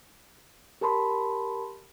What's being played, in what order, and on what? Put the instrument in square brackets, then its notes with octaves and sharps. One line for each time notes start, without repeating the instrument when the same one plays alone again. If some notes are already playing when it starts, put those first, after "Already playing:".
[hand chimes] G4 A#4 A5 B5 C6